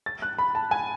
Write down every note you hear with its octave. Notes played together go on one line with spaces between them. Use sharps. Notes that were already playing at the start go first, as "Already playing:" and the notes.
A6
F#6
B5
A5
G#5